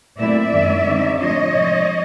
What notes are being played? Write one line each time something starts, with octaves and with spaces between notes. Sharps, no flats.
A#2 F#3 A3 C4 E4 D5 E5
F#2 D#3 G#3
D3 G3 C4 D#4
A2 F3 A3 D4 F4 C#5 D#5
C3 F3 G#3